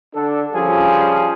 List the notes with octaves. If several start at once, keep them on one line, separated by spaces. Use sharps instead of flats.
D3 D4 A4
F3 G3 C#4 F4 G#4